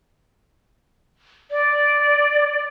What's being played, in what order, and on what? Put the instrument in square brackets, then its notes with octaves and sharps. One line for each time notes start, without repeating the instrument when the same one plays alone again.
[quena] D5